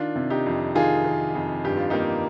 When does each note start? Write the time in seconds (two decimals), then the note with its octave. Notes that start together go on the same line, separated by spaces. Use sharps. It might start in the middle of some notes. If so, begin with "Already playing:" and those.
Already playing: D#3 D4 F4
0.16 C3
0.30 D#4 G4
0.46 F2
0.75 D#3 F4 G#4
1.05 D#3
1.35 F2
1.64 G2 G4
1.77 F4
1.90 A#3 D#4 G4